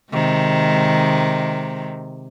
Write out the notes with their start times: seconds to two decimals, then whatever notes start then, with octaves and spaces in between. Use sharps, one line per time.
0.12 C3 D#3 G#3